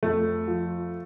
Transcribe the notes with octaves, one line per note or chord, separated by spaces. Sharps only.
F2 A3
F3